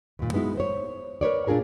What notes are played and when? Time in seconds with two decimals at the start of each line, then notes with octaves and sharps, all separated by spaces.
0.19 D#2 A#2
0.33 G#3 B3 D#4 E4 F#4
0.57 C5 C#5
1.21 A#4 B4 C#5 D5
1.47 A#2 D4 F4 G#4 A#4